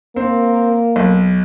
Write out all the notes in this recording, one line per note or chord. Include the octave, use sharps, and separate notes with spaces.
A#3 C4
B1